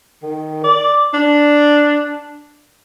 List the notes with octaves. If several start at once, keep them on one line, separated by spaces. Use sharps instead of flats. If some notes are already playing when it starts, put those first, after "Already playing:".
D#3
D5
D4